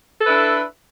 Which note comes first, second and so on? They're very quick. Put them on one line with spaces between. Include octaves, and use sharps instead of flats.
A4 B4 E4 D4